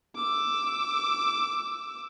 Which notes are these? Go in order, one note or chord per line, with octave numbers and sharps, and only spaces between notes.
D6 E6